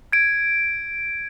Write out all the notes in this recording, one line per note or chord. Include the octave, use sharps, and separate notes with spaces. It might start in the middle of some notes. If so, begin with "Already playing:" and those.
G#6 D7